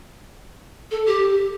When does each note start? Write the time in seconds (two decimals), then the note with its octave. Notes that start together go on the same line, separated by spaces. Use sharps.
0.90 A4
1.07 G4